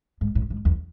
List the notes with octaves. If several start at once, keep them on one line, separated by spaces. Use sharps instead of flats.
G#2
A2
G#2
E2